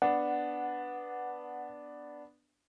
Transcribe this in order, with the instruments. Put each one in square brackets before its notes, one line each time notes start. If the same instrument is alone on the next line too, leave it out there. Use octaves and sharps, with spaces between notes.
[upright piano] B3 D4 [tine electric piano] F#5